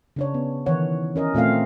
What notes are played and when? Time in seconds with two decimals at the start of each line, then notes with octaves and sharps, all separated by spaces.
0.16 C#3 D4 C#5
0.34 B3
0.66 D#3 E3 C#5 F#5
1.16 C#4 A#4 D#5
1.34 A#2 A3 C4 F5